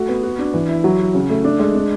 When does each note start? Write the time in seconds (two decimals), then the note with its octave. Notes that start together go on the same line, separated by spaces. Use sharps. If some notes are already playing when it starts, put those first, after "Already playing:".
Already playing: A3 F#4
0.09 B3
0.23 F#4
0.39 D4
0.54 E3
0.69 E4
0.84 F#3
0.99 F#4
1.14 C#3
1.30 A3
1.44 D4
1.59 G#3
1.75 D4